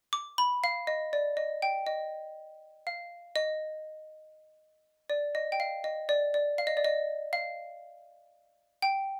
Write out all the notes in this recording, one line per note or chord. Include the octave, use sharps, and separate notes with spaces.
D6
B5
F5
D#5
D5
D#5
G5
D#5
F5
D#5
D5
D#5
G5
F5
D#5
D5
D5
F5
D#5
D5
D#5
F5
G5